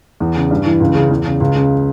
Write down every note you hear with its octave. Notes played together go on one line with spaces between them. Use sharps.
E2
C#3
G2
E3
C#2
C#3
E2
C#3
C#2
C#3